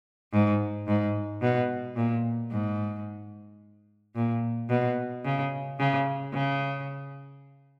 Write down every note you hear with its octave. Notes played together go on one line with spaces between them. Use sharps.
G#2
G#2
B2
A#2
G#2
A#2
B2
C#3
C#3
C#3